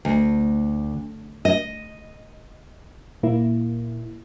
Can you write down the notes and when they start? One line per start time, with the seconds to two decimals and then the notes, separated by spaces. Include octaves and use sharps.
0.05 D2
1.45 D#5
3.23 A#2 A#3 E4